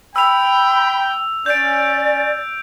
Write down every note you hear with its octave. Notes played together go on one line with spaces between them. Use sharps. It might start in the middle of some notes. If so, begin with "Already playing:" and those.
G5 B5 E6 F7
C#4 D5 G6 D7